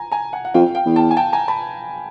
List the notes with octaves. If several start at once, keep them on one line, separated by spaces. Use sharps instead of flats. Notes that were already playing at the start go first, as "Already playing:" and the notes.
Already playing: G#5 A#5
G#5 A#5
F#5 G#5
F#5
F2 F5 G5
F5 G5
E2
G5 A5
G#5
G5 A5
G#5 A#5
A5 B5